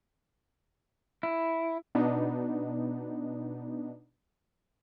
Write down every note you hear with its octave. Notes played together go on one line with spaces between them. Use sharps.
E4
B2 B3 D4 D#4